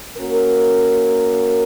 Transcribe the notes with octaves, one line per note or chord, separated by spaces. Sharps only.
A#3 C#4 F#4 A#4